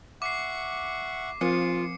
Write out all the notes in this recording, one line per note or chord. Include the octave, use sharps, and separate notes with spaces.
E5 F#5 C#6 D6 C7
F3 C4 F4 C5 C#7